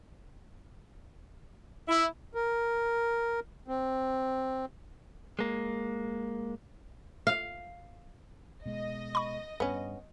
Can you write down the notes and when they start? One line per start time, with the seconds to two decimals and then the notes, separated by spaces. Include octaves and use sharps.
1.87 E4
2.35 A#4
3.68 C4
5.39 G#3 A#3
7.27 F5
8.66 B2 G#3 D#5
9.15 B5 C#6
9.60 G2 B3 C#4